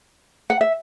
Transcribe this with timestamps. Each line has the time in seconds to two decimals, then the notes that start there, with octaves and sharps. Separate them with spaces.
0.50 F#5
0.61 E5